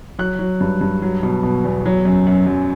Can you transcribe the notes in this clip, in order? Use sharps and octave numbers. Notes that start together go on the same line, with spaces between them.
F#3 F#6
F#3
G2
G2
F#3
B2
B2
E2
F#3
F#2
F#2
F#2